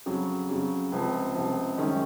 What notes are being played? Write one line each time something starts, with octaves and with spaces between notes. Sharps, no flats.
F2 C#3 F#3
F2 C#3 F#3
C#2 C3 F3
C#2 C3 F3
F#2 D#3 G#3 C#4